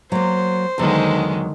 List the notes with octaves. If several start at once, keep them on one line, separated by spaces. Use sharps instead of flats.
F#3 A#3 C5
E2 D3 D#3 F#3 G#3